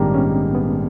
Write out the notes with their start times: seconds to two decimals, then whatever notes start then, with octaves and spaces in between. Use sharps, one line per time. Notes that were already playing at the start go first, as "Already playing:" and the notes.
Already playing: A#1 G#2 D#3 G3 A#3 C4 D4
0.14 B3 C#4
0.55 B3